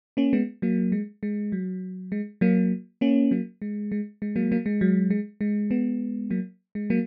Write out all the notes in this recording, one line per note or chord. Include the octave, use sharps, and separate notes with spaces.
A#3 C#4
G#3 B3
F#3 A#3
G#3
G#3
F#3
G#3
F#3 A#3
A#3 C#4
F#3 A#3
G#3
G#3
G#3
F#3 A#3
F#3 A#3
G#3
F#3
G#3
G#3
G#3 B3
F#3 A#3
G#3
F#3 A#3